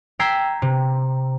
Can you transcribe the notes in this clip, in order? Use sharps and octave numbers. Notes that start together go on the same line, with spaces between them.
G5 A#5 E6 G#6 B6 C7
C3